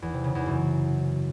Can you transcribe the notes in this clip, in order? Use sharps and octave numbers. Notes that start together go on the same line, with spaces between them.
E2
C3
C#3
E2
F#2